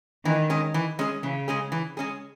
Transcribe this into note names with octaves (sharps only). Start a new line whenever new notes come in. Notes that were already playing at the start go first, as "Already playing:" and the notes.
D#3 E3
G#3 C#4 G#4
E3
G#3 C#4 G#4
C#3 E3
G#3 C#4 G#4
E3
G#3 C#4 G#4